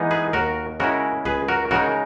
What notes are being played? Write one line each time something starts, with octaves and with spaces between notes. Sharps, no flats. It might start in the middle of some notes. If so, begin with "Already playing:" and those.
Already playing: E3 G#3 B3 D#4
G#4 B4
D#2 F#4 A#4
C#3 G#3 C#4 E4 F#4 A#4
C#2 G#4 B4
F#4 A#4
C#3 G#3 D#4 F#4 A#4